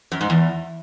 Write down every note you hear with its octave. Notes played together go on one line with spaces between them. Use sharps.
F#2
G#2
E2